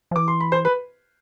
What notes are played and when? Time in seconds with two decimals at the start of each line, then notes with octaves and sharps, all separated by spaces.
0.11 F3
0.16 E3 D6
0.28 C6
0.40 B5
0.52 C5 C6
0.65 B4 B5